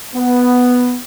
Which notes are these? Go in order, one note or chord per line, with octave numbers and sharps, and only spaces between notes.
B3